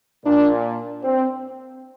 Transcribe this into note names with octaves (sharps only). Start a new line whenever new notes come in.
A#2 D4
C4